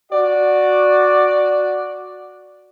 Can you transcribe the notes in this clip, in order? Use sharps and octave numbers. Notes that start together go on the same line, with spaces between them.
F#4 D5